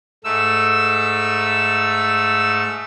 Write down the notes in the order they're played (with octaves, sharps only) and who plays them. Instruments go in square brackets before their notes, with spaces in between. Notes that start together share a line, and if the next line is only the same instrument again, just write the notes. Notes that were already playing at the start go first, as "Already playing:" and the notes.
[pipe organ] G#2 A3 E6